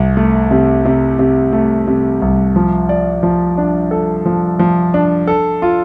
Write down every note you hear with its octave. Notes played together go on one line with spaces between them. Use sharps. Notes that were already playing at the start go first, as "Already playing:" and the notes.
Already playing: C2
A3
C3
C3
C3
A3
C3
C2
F3
D5
F3
D4
A4
F3
F3
D4
A4
F4